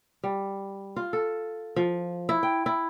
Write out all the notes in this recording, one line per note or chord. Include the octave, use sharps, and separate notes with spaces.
G3
F4
A4
F3
E4
G5
E4